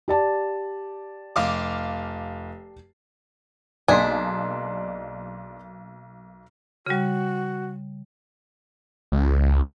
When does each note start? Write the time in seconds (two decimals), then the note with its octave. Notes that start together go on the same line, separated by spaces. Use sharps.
0.08 G4 D5 A5
1.36 F1 F5 D6
3.88 B1 A#3 D4 G#4 D5 D#5 C6 B6
6.86 C#3 G3 F#4
9.12 C#2